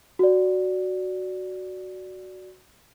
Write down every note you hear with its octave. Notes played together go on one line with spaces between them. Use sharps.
F#4 D5